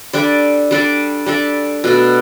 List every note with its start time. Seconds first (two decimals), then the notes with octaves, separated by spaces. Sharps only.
0.13 G3 D4 A4 D5
0.71 G3 D4 A4 D5
1.26 G3 D4 A4 D5
1.84 B2 A3 D4 A4